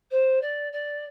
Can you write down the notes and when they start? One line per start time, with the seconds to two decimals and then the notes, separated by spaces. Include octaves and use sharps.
0.11 C5
0.41 D5
0.72 D5